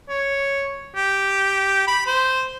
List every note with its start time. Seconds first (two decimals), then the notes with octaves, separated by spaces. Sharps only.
0.09 C#5
0.96 G4
1.87 B5
2.07 C5